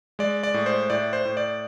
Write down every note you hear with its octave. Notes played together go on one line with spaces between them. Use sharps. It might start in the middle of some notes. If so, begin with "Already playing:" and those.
G#3 D5
D5
A2
C5
A2 D5
C5
A2
D5